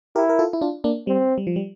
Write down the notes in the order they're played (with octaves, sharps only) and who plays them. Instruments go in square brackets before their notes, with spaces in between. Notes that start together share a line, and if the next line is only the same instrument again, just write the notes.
[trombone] E4 [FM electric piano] G4 A#4
[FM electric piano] A#4
F4 A4
E4
D4 F4
A#3 D4
[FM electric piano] G3 [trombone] C4
[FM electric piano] G3
F3
G3